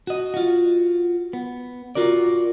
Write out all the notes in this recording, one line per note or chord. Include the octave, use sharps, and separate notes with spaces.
F#4 D#5
F4 F#4
B3
F4 F#4 A#4 D5